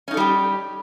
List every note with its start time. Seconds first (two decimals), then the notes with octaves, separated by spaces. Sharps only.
0.08 C#4
0.11 D#4
0.14 A4
0.17 G3
0.20 G4